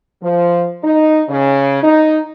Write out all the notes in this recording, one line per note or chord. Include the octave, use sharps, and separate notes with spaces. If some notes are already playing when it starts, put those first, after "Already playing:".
F3
D#4
C#3
D#4